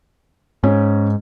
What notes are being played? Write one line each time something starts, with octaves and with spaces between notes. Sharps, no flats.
G#2 C#4